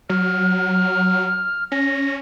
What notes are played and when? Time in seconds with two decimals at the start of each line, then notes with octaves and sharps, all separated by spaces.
0.09 F#3 F6
1.72 C#4 A#6